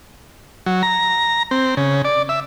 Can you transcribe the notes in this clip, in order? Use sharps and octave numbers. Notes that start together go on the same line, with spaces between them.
F#3
A#5
C4
C#3
D5
E5